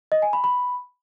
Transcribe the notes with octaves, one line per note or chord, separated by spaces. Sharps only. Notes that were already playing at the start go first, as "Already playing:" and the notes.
D#5
G#5
B5
B5